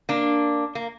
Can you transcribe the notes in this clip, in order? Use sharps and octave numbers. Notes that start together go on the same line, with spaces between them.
A#3 D4
A#3